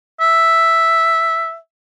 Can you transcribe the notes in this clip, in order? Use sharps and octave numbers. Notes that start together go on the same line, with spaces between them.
E5